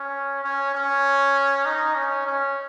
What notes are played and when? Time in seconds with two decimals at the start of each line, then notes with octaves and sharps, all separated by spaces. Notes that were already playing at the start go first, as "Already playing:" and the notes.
Already playing: C#4
0.44 C#4
0.75 C#4
1.65 D#4
1.95 C#4
2.26 C#4